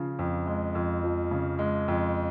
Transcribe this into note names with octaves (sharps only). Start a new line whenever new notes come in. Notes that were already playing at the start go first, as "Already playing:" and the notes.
Already playing: C#3 F3
F2
G#3
F2
F3
C#3
G#3
F2